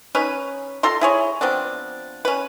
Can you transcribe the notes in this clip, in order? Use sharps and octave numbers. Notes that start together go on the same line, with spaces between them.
C#4 D#4 B4
F4 A4 A#5 C6
E4 G#4 C#5
F3 B3 C4 D4
C#4 B4